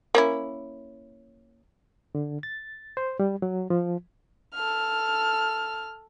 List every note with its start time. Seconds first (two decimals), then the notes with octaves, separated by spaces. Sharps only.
0.15 A#3 C#4 E4
2.15 D3
2.43 A6
2.97 C5
3.20 G3
3.42 F#3
3.70 F3
4.54 A4 F6